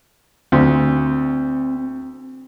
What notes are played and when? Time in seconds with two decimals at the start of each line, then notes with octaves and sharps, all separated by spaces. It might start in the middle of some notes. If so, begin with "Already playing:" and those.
0.52 D2 C4